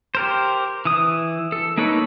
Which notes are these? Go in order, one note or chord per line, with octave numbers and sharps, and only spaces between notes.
G4 A#4 C5
E3 D#6
A4
A#3 D#4 A4 B4 C#5